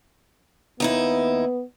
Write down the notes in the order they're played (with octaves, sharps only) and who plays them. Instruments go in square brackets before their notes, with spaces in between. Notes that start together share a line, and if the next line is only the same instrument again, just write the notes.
[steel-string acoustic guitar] D#2 D#4 E4 [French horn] B3